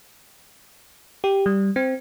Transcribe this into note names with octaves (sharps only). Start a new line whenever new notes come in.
G4
G3
C4